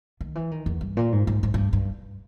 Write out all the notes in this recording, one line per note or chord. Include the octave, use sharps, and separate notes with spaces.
D#3
E3
D#3
E2
G2
A#2
G#2
G#2
G#2
G#2
G2
G2